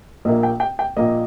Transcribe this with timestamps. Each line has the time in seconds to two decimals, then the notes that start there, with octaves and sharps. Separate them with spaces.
0.25 A#1 A#2 A#3 D#5
0.43 G5
0.60 G5
0.79 G5
0.96 A#1 A#2 A#3 D#5